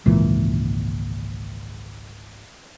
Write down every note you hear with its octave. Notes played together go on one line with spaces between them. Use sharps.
G#1 C#2 A#2 E3